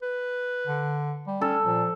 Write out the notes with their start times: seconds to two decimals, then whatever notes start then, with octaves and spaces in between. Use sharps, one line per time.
0.02 B4
0.67 D3
1.27 G3
1.41 C#4 A4
1.64 A#2 F3